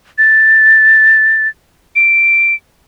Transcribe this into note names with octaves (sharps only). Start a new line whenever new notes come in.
A6
D7